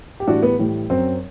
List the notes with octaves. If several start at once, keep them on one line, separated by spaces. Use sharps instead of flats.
G4
A2 E3 G3 D4 F#4
B3
A2 E3 G3
F#2 F#3 C4